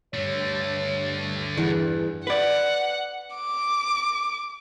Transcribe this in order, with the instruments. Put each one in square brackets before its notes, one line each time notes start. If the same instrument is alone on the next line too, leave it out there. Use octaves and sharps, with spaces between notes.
[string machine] G2 [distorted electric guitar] D3 A3 [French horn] C#5
[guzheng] E2
[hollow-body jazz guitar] B4 D5 [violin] F#5
[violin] D6